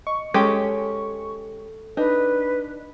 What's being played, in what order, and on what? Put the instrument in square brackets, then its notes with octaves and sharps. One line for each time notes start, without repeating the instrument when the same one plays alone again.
[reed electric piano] D#5 [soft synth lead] C#6
[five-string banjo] G#3 C#4 G4 [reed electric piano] A4
[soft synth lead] D4 [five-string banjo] D#4 [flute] B4